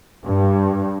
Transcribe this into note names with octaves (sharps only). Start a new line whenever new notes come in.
G2